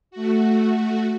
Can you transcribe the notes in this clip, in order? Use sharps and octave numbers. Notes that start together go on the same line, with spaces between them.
A3 F#4